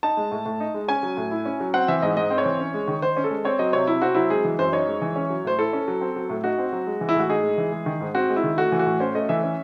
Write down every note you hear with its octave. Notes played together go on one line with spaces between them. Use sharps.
D#4 A5
G#3
A2
A2
D#4
G#3
C#4 G#5
F#3
A2
E4
C#4
F#3
C4 F#5
E3 E5
G#2 D#5
G#2 D#5
C4
C#5
E3
C#4
G#3
D#3
D#3 C5
C#4
A4
G#3
C4 C#5
F#3 D#5
C3 C#5
C3 E4
C4 F#4
F#3 E4
G#3 G#4
E3
F#2 C5
D#4 C#5
G#3
E3
C#4
F#3
A2 C5
E4 A4
C#4
F#3
C4
F#3
A2
D#4 F#4
C4
F#3
G#3
E3
E4
A2 F#4
D#4 G#4
G#3
E3
G#3
D#3
G#2
C4 F#4
G#3
E4
D#3
A3 F#4
E3
F#4
A2
C#4 C5
A3 D#5
E3 E5
C#4